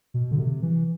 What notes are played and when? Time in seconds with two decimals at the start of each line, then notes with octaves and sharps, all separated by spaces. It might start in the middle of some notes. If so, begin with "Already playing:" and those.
0.14 B2
0.31 D3
0.38 C3
0.62 E3